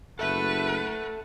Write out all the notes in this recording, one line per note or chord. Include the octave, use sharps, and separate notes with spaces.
F#1 A4 B4 E5 F#5